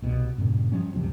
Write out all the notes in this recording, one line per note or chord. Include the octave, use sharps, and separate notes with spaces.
C2 B2 F3 B3
G2 A#2 C#3 A#3
F3 G3 C#4
C#2 F#2 C3 F3